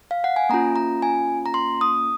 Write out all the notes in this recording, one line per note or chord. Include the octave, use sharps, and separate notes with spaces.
F5
F#5
G#5
A#3 C#4 F4 A#5
A#5
G#5
A#5
C6
D#6